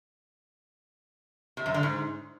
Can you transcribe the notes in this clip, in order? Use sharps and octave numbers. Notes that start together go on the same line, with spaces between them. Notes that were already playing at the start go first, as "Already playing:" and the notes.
C3
F#2
D3
G#2